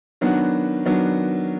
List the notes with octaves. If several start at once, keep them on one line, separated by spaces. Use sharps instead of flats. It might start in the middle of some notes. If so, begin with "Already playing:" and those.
D#3 F#3 B3 D4 F#4
D#3 F#3 B3 D4 F#4